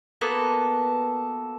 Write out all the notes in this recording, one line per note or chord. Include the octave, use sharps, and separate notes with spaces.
A#3 B3 F#4 A4